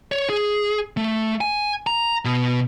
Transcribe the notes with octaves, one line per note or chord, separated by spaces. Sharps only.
C#5
G#4
A3
G#5
A#5
B2